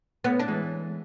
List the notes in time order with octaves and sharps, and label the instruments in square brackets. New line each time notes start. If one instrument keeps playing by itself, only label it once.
[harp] A2 [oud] B3
[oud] D4
[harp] E3 G#3